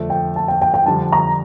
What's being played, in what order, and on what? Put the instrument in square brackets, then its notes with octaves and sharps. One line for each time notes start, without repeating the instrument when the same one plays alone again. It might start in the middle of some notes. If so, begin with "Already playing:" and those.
Already playing: [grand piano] F2 D3 A3
[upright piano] G5
A5
G5
G5
G5
[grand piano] F2 D3 G3 [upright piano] A5
[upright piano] A#5